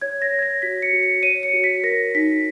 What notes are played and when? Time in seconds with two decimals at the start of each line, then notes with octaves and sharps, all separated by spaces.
0.02 C#5 G#6
0.22 A#6
0.32 C#5
0.39 G#6
0.42 A#6
0.62 F#4 B6
0.82 C#7
0.93 F#4
1.03 C#7
1.23 C#5 D#7
1.43 C#7
1.54 F#4
1.64 B6
1.84 A#4 A#6
2.15 D#4 B6